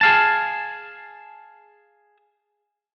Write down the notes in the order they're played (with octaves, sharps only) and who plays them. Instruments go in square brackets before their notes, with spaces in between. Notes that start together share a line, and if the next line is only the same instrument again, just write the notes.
[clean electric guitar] G#4 F5 A5